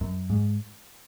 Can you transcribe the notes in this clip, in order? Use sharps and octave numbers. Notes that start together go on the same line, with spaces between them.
F#2
G#2